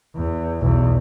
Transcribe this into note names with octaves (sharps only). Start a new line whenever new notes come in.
E2
B1 E2